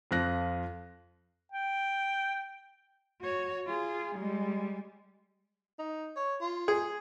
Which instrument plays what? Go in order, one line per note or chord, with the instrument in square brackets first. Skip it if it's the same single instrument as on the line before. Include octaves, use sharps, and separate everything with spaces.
[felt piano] F2 F3 F#6 A#6
[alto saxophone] G5
[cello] F#4 C#5
F4 G#4
G3 G#3
[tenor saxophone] D#4
C#5
F4
[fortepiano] G#4